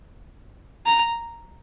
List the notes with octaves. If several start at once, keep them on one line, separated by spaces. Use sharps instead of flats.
A#5